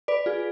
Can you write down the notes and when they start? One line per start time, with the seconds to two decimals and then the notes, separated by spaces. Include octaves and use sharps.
0.08 B4 D5
0.26 F4 G#4